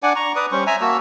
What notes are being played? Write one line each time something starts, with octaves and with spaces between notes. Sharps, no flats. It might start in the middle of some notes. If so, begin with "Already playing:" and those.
D4 D5 F#5 G#5
A#5 C#6
B4 D5 D#6
G3 C#4 C5 C#6
E5 G#5 A#5
A#3 F#4 A5 E6